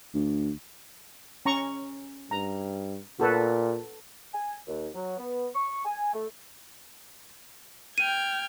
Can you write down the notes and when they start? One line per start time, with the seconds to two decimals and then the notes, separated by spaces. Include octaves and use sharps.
0.14 D2
1.46 C#4 A#5 C#6
2.31 G2 A#5
3.20 A#2 F#4 A4 B4
4.34 G#5
4.67 D#2
4.94 F#3
5.17 B3
5.54 C#6
5.85 G#5
6.13 A3
7.98 G5 F6 G#6 D#7